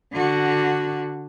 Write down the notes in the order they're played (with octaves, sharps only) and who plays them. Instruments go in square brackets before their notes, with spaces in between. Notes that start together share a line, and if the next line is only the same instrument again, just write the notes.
[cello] D3 F#4